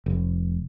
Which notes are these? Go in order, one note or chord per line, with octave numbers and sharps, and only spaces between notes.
F1